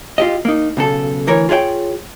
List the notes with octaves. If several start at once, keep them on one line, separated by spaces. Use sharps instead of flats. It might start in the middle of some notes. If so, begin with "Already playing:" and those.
F4 G4 D#5
A#3 D#4
B1 C#3 A4
D2 E3 A#4 C#5
F4 G#4 C#5 D#5 G5